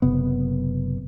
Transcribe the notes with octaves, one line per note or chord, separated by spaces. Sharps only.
F#1 C3 B3